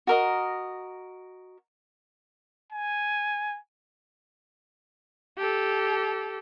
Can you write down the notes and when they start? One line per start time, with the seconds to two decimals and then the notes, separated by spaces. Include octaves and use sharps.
0.07 F#4 A#4 D#5
2.72 G#5
5.38 G4 A4